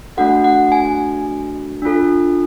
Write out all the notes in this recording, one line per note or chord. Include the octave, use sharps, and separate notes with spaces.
A3 D4 F#4 A4 F#5
F#5
G#5
D4 F4 A4